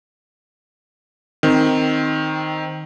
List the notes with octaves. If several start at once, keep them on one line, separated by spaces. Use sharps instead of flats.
D#3 C4